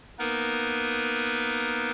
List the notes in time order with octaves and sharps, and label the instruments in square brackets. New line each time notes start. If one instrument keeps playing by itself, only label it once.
[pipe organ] A#3 B3 D#4 A#4 B4